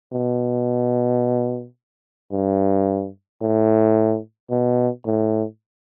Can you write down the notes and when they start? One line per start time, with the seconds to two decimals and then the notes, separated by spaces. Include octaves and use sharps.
0.13 B2
2.32 G2
3.42 A2
4.50 B2
5.06 A2